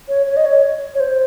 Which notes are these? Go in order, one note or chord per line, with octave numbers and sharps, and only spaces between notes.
C#5
C#5
D#5
C#5
C#5
C5